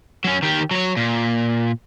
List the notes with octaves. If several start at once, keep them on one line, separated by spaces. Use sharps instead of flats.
F#3 C#4
D#3 G4
F#3 C#5
A#2